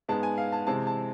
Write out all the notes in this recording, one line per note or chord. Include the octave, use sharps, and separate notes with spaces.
G#2 G#3 B3 A5
G#5
F5
A5
C3 E3 G#3 C4 A5
A5